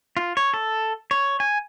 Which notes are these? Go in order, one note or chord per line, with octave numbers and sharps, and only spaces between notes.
F4
C#5
A4
C#5
G#5